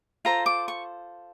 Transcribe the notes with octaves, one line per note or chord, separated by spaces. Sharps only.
F4 A4 C5 A#5
D6
C#6